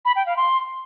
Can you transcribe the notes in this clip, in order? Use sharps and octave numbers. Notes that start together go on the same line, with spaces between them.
B5
G5
F5
C6